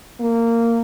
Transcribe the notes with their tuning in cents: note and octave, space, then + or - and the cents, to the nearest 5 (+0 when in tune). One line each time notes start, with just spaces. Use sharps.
A#3 -15